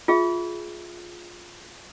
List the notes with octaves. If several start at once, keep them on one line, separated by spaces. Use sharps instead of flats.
F4 G#4 E5